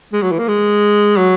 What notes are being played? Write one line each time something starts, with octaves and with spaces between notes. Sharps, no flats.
G#3
F#3
E3
A#3
G#3
F#3